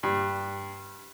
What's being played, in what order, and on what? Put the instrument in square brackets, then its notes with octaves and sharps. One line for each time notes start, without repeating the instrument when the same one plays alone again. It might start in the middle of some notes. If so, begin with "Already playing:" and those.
[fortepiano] G2